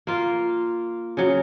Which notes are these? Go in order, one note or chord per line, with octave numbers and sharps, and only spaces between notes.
A#3 F4
C#3 F#3